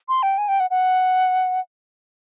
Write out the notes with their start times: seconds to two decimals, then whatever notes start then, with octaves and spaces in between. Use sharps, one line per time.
0.08 C6
0.23 G5
0.38 G#5
0.48 G5
0.60 F#5
0.70 F#5